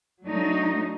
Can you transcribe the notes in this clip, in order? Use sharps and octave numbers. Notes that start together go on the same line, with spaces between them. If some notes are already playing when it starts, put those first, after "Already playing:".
F#3 A3 D4 D#4